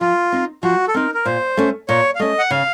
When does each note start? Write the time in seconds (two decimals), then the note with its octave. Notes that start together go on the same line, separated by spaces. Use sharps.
0.01 F3 F4
0.32 C4 D#4
0.63 F3 F#4
0.88 A4
0.94 C4 D#4 A#4
1.14 A#4
1.25 A#2 C5
1.57 A3 C#4
1.89 A#2 C#5
2.15 F5
2.19 A3 C#4 D#5
2.39 F#5
2.51 C#3 F5